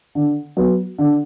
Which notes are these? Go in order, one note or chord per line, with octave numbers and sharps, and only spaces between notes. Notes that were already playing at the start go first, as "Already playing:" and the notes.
D3
F#3 B3
D3